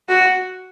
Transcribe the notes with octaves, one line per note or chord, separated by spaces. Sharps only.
F#4